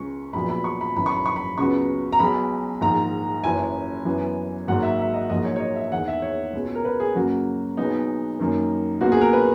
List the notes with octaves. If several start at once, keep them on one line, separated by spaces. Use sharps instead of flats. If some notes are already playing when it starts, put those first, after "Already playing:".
Already playing: C#2 C#3 G#3 C#6
A#1 A#2 F#3 B3 B5
B5
C#6
B5
G#1 F#2 E3 B5
C#6
B5
C#6
B5
C#2 C#3 F#3 B3 C#6
A#5
B1 B2 G#3 B5
A#1 G#2 D#3 A#5
F#1 F#2 E3 G#5
F#2 E3 B3
G#1 G#2 F#3 A#3 F#5
E5
E5
D#5
A#1 G#2 F#3 A#3 D#5
C#5
C#5
D#5
E5
E2 D#3 G#3 F#5
E5
C#5
C#2 B2 G#3
A#4
B4
G#4
F#2 C#3 F#3 A#3 F#4
B1 B2 G#3 B3 D#4
F#2 D#3 A#3
C#2 B2 A#3 F#4
G#4
A#4
B4